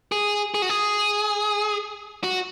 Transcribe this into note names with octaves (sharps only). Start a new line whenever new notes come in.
G#4
G#4
F#4
G#4
F#4